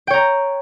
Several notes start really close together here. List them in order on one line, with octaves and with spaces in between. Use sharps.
G5 C#5 A#5